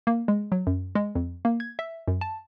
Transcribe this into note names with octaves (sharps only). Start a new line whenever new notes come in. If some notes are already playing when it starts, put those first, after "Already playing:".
A#3
G#3
F#3
F#2
G#3
F2
A#3
G#6
E5
F#2
A5